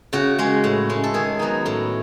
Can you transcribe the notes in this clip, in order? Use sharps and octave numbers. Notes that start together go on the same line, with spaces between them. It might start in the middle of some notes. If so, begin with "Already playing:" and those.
C#3 F#4
G#3 C#4
A2
G#3 C#4
A4
D#3 G#4
F#3 B3 D#4
A2